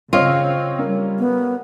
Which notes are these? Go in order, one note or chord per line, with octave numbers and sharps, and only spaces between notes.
C#3 C4 F4 C#5 D#5
G3 A#3 C#4
B3